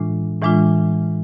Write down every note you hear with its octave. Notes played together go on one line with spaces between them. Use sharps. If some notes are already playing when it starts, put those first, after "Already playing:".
Already playing: A2 E3 G#3 D4 F4
A2 E3 G#3 D4 F4